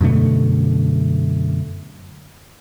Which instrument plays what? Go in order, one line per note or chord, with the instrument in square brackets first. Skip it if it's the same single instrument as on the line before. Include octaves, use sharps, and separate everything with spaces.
[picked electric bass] F#2 B2 D3 A3